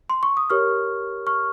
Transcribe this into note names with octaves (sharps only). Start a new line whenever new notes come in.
C6
C#6
D#6
G4 A#4 C#5 C#6 F6
C#6 F6